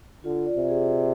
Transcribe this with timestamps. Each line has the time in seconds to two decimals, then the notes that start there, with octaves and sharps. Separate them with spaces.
0.24 D3 F4
0.46 D5
0.57 C3
0.69 G#4